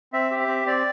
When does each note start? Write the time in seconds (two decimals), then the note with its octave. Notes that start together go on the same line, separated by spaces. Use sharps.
0.13 C4 E5
0.31 G4
0.40 E5
0.48 C4
0.66 C4 D5